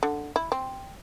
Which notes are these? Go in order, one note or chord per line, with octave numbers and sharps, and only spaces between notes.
D3
E4
C4